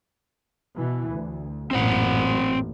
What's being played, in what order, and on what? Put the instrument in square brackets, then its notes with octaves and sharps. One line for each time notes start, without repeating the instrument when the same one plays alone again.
[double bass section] B2 E3
D2
[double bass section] A1 F#2 A#2 [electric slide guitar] C4 C5 F#5